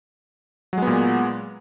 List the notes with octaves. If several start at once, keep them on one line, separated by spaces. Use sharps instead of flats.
A#2 F#3 G#3 B3